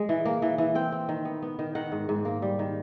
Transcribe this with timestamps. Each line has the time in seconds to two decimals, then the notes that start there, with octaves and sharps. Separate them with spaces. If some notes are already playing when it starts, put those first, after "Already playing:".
Already playing: G#3
0.09 E3
0.25 A#3
0.42 E3
0.58 E3
0.75 C4 G5
0.92 C4
1.09 D#3
1.25 B3
1.42 B3
1.59 D#3
1.75 D#3 F#5
1.92 G#2
2.09 G#2
2.25 A#3
2.42 G3
2.59 D#3